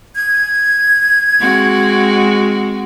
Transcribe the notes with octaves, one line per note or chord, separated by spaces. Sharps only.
G#6
G#3 C4 F#4